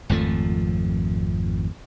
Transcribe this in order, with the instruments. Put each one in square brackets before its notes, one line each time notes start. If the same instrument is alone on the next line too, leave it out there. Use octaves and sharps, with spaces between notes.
[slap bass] G#1 F2 F3 A3